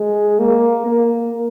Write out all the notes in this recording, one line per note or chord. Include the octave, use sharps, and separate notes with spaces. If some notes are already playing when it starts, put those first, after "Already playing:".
Already playing: G#3
A#3
A#3